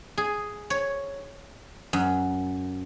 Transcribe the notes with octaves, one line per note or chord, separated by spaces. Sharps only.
G#4
C#5
F#2